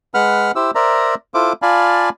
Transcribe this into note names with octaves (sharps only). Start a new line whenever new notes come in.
G#3 B4 F#5 B5 F6
E4 G4 C5 E6
A#4 C5 D5 E5 A#5
E4 F4 A4 C5 D6
F4 D5 F5 G#5 A5 B5